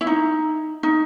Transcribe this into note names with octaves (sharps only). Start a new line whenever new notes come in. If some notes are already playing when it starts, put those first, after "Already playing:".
E4
D#4
D#4